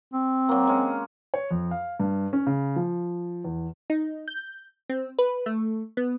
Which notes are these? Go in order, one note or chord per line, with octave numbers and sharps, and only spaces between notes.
C4
F#3 A#3
G#3 C#4
C#5
F2
F5
G2
C#4
C#3
F3
E2
D#4
G6
C4
B4
A3
B3